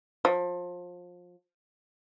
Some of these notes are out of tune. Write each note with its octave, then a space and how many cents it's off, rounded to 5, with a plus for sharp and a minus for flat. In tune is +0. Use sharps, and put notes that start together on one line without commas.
F3 +25